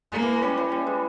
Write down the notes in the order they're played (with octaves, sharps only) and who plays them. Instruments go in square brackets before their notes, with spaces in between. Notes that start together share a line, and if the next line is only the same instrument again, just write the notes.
[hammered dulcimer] G#3 [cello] A#3
[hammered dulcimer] E3
E3
[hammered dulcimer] G3 [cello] C#4
[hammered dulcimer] E3
G3
G#3